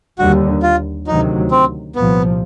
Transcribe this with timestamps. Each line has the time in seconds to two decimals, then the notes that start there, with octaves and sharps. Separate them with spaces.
0.18 D#2 D3 G3 F#4
0.63 F4
1.07 D2 C3 D#3 F#3 D#4
1.51 C4
1.96 C2 A#2 F3 B3